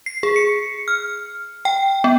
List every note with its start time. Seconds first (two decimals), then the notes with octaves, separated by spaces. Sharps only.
0.06 C7
0.23 G#4
0.36 C#7
0.88 F6
1.65 G5
2.04 B3